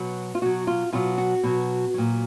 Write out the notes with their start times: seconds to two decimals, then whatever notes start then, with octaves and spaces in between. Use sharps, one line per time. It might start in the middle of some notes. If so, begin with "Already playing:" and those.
Already playing: B2 F#3
0.35 F4
0.42 B2 F#3 F#4
0.67 F4
0.93 B2 F#3 F4
1.18 F#4
1.44 B2 F#3
1.94 A#2 F#3